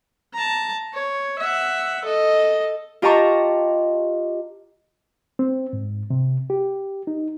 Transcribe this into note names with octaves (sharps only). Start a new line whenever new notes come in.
A5 A#5
C#5
E5 F#5
A4 D#5
F4 G4 D#5 A5 A#5 C#6
C4
G#2
C3
G4
D#4